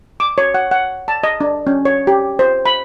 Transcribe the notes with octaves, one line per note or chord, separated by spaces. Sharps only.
D6
C#5
F#5
F#5
A5
D#5
D4
C#4
C#5
G4
C5
B5